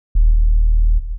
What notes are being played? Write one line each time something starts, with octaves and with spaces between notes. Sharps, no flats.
D#1